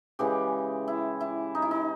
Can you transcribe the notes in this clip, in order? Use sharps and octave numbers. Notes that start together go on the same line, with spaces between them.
C#3 E3 G#3 G4
E4
E4
D#4
E4
D#4